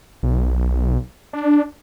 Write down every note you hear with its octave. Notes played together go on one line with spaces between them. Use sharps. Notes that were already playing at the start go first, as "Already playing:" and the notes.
B1
D4